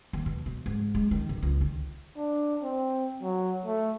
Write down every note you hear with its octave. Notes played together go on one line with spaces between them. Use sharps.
D#2
B2
B2
G#2
G#3
D#3
B1
C#2
D#3
D4
C4
F#3
A3